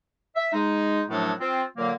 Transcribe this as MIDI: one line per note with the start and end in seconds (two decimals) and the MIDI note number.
0.36 0.48 76
0.53 1.02 56
0.53 1.02 63
1.09 1.33 42
1.09 1.33 45
1.09 1.33 53
1.09 1.33 54
1.09 1.33 57
1.09 1.33 62
1.39 1.63 60
1.39 1.63 65
1.77 1.92 46
1.77 1.92 50
1.77 1.92 54
1.77 1.92 58